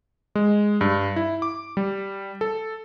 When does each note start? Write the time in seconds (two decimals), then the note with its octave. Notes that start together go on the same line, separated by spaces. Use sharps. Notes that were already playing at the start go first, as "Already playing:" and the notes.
0.35 G#3
0.81 G2
1.16 E4
1.42 D6
1.77 G3
2.41 A4